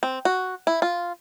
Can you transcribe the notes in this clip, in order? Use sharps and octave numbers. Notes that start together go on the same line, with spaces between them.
C4
F#4
E4
F4